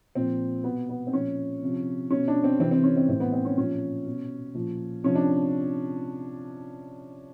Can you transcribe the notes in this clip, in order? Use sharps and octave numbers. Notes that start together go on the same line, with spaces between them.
A#2 F3 C4
B2 B3
B3
C4
A#2 F3 C#4
C3 F3
B2 C#4
D4
C4
C3 E3 C4
C4
C#4
C4
A2 E3 C4
B3
C4
C#4
A#2 F3 C#4
B2
A#2 F3
C3 F3 C#4
D4